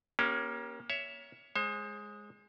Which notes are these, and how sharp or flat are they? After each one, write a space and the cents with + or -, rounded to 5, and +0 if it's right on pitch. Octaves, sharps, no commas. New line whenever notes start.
A#3 +25 C#4 +0 G4 +0
C#5 +15 E5 +0
G#3 +0 C5 +40